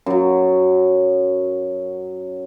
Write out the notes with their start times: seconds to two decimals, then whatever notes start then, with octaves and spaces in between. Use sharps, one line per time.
0.06 F#2 F#3